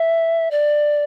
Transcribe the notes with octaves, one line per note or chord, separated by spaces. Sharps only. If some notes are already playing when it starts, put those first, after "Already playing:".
Already playing: E5
D5